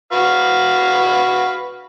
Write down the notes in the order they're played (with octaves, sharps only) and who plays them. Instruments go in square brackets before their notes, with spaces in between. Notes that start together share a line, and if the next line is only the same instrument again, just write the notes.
[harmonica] F#4 B4 F5